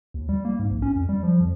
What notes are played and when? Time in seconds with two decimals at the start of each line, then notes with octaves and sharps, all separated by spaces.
0.14 D#2
0.29 G3
0.45 A#3
0.59 G#2
0.71 A#1
0.82 C#4
0.96 F2
1.09 G3
1.23 F3
1.40 F2